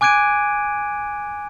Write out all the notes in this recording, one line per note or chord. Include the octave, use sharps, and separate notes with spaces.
G#5 D6 F#6 G#6 D7 D#7